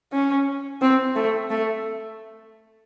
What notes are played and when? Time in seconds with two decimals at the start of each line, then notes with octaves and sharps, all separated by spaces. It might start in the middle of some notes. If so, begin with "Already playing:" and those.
0.12 C#4
0.81 C4
1.16 A3
1.50 A3